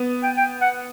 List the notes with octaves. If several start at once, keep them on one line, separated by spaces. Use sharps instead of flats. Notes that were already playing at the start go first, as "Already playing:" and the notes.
Already playing: B3
G5
G5
F#5